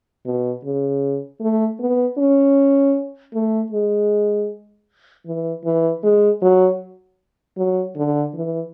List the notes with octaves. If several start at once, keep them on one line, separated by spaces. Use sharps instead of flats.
B2
C#3
A3
B3
C#4
A3
G#3
E3
E3
G#3
F#3
F#3
D3
E3